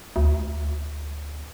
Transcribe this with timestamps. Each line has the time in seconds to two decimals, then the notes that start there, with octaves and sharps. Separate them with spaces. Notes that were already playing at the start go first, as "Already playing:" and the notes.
0.16 D2